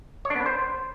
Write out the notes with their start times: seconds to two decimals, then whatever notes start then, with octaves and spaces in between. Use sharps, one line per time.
0.25 C#5
0.30 D4
0.35 B3
0.41 B4
0.46 C5